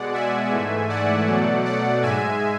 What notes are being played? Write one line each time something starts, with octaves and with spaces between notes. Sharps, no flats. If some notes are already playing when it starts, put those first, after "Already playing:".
Already playing: B2 G#3 D5 F#5
E5 G#5
G#2 E3 A3
D5 F#5
B2 F#3 A3
D5 F#5
G#2 G#3 E5 G#5